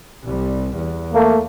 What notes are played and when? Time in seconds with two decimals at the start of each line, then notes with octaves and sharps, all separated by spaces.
0.24 C2 G3
0.75 E2
1.13 A3 A#3